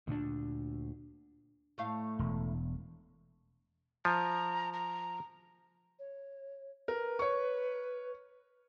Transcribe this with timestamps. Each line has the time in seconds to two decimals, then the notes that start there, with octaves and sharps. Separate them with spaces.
0.08 D2 A#2 C4 D4
1.78 A2 A3 F5
2.19 E1
4.05 F3 A#5
4.73 A#5
5.99 C#5
6.88 A#4 B4
7.19 C#5 C#6